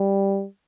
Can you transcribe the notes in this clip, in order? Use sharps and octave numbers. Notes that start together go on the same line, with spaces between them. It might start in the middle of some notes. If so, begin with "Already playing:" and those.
Already playing: G3